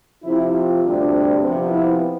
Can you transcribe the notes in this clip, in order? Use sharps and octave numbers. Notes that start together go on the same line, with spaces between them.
C3 F3 C4 E4
F4
D2 C3 G3 D4
C3 F3 B3
E4